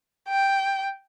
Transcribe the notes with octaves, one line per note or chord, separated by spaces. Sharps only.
G5